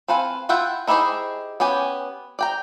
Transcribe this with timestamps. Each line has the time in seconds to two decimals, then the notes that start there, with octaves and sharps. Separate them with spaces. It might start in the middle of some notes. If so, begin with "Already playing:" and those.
0.08 C4 A4 B4 F5 G#5
0.49 E4 F4 E5 F#5 G5
0.87 D#4 E4 G4 G#4 C5
1.60 B3 C#4 G4 G#5
2.39 D5 G5 A#5